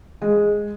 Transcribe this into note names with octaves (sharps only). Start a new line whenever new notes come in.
G#3